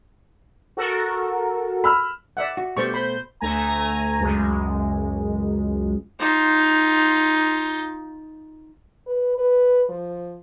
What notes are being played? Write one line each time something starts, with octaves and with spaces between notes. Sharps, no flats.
F#4 A4 A#4
B5 E6 F6
D5 E5 F#5
F#4
G2 B2 G3 A3 G4 C5 C#6
C5 B5
D2 A3 G#5 A#5
C#2 F#2 G#3
D#4 F4
B4
B4
F3